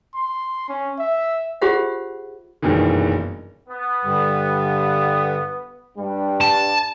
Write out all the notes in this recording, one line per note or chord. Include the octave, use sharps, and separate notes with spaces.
C6
C#4
E5
F4 G4 G#4 C5 E5 F#5
F#1 G2 B2 D#3 E3
B3
G2 D3 G3
G2 G3 D4
A5